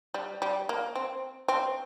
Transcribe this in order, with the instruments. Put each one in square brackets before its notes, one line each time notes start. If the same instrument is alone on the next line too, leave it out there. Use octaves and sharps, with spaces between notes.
[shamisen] G3
G3
A#3
C4
C4